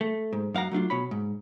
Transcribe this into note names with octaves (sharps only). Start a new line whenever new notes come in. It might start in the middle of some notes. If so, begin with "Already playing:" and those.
A3
G#2
F#2 F5 F#5 A#5
F#3 A3 D4 F4
B2 C#5 B5
G#2